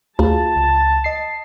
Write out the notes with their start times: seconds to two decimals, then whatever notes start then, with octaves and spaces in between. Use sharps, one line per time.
0.19 D2 F4 G#4 A5
0.56 C#2
1.04 D#5 C7